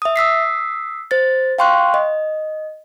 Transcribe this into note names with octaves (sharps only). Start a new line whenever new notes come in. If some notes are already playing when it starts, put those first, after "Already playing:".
E5 D#6
D#6 E6 B6 C7
C5 A6
F5 G5 C6 C#6 F#6
D#5